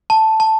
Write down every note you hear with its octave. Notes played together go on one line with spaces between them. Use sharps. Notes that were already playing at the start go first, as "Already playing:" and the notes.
A5
A5